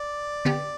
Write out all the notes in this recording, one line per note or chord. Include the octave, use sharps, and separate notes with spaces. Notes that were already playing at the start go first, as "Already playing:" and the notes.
Already playing: D5
D3 B3 G4